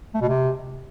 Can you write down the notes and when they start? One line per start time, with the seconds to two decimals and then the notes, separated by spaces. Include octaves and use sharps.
0.14 A3
0.21 B2
0.28 C3